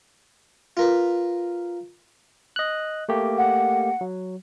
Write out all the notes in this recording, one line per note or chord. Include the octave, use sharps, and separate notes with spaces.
F4 A#4 B4
D#5 F#6
A3 A#3 G4
F#5
F#3